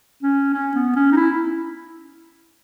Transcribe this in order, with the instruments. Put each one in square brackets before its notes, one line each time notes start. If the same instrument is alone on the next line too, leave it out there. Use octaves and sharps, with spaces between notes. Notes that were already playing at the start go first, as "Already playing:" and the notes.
[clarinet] C#4
C#4
B3
C#4
D#4
E4